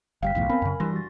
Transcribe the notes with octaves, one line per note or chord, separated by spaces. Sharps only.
G1 G2 F5 G5 B6
B1 E2 A2
B3 C4 A#4 G#5 B5
F#2 C#3
E3 G3 D4 C6 A#6
F#4 A6